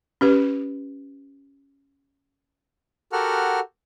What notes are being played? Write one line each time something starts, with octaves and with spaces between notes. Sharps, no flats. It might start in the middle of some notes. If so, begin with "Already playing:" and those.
C#4 G4 B4
F#4 G4 A4 A#4 F#5 F6